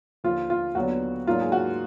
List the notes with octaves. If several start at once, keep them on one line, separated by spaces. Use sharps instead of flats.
D#2 D3 F3 F4
F4
D#2 D3 F#3 B3 D4 F#4
G#2 F#3 A#3 D4 F4
G#4
F#4